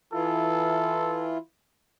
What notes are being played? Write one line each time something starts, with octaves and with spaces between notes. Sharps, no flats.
E3 E4 F4 A4